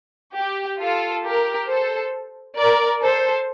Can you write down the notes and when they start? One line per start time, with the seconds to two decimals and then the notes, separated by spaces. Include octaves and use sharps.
0.37 G4
0.80 F4 A4
1.25 G4 A#4
1.69 A4 C5
2.57 A#4 D5
3.02 A4 C5